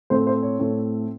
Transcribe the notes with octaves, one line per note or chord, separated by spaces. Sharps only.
A2 A3 C4 C5
C5
C#5
A2 A3 C4